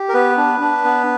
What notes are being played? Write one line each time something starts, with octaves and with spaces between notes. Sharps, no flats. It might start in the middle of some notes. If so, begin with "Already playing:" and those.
Already playing: G4
A#4
B3 B4
D4
D4
B3